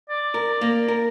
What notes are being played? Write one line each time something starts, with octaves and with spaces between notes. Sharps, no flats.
D5
A#4
A#3
A#4